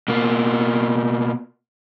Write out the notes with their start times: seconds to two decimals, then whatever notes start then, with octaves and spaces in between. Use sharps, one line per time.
0.08 B2 A#3